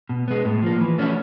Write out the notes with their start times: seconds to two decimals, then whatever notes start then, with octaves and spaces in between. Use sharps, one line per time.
0.09 B2
0.28 G#3 B3
0.45 A2
0.63 F3 A#3
0.81 E3
0.98 A3 C#4 F#4